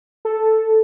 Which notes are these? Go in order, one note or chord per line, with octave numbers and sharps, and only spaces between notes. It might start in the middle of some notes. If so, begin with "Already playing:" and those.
A4